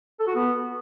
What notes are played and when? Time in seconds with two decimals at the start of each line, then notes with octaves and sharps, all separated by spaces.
0.20 A4
0.27 F#4
0.35 B3